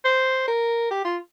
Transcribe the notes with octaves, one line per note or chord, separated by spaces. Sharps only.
C5
A#4
G4
F4